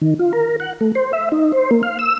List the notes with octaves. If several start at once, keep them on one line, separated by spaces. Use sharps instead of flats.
D#3
F4
A#4
F#5
A3
C5
E5
D#4
C5
A#3
F5
E6